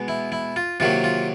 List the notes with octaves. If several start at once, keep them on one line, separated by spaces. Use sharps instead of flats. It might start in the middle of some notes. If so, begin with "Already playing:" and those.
Already playing: B2 G#3 B3
E4
E4
F4
C3 D#3 F#3 A#3 F4
F4